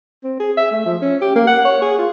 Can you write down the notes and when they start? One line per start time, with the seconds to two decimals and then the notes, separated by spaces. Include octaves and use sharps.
0.24 C4
0.40 G#4
0.57 E5
0.71 A3
0.86 F3
1.02 C#4
1.21 G4
1.36 A#3
1.47 F#5
1.65 C#5
1.82 G#4
1.98 F4